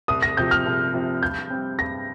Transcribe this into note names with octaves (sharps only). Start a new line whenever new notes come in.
C2 D#6
A#6
C3 F3 G6
F6
C2
C3 F3
G2 G6
G3 C4
G2 A#6